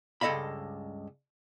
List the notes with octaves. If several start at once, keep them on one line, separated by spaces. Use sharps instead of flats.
C#2 G2 A4 D#5 F5 B5